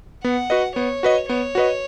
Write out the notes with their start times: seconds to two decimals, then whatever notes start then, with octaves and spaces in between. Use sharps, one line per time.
0.24 B3 F#5
0.50 F#4 B4 D#5
0.76 B3 C#5
1.03 F#4 B4 D#5
1.29 B3 C#5
1.55 F#4 B4 D#5